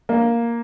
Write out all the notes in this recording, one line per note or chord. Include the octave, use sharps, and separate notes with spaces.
A#3